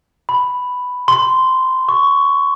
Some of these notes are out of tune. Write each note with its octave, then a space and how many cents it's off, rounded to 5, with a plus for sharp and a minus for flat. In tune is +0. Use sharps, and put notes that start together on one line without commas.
B5 +5
C6 -10
C#6 +15